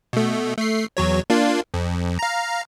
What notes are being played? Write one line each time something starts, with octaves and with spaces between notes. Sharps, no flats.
B2 A3
A3 C7
E2 F#3 C#5
A#3 D4 F4
F2
F5 A#5